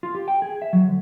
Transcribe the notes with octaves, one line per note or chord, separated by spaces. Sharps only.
F4
G4
G5
G#4
E5
F#3
D2